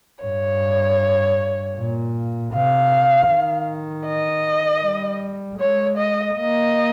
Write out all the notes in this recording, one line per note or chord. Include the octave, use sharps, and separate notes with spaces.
G2 C#5
A#2
C3 F5
D#3
D#5
G3
G#3 C#5
D#5
A#3 D#5